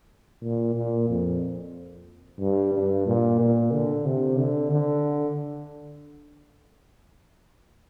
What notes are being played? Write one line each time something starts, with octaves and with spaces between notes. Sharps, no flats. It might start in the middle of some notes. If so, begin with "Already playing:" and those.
A#2
A#2
F2
G2
G2
A#2
A#2
D3
C3
D3
D3